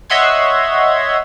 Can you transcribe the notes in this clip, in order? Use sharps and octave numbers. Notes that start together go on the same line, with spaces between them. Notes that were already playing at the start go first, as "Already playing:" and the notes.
C#5 D#5 E5 F#5 C6 G#6